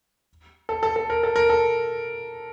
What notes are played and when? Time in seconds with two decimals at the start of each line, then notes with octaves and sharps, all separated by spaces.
0.69 A4
0.83 A4
0.96 A4
1.10 A#4
1.23 A4
1.36 A#4
1.50 A4